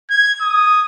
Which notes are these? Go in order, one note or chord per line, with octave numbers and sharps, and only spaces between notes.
G#6
D#6